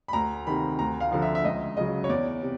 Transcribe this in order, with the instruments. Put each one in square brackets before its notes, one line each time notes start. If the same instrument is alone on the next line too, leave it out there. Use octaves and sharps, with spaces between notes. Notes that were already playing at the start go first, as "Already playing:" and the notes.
[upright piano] B5
D2 A#5
C3 D#3 B5
D2 A#5
F5
D3 F3 F5
E5
E5
C#2 D#5
C#3 F#3 D#5
C#5
E2 D5
C3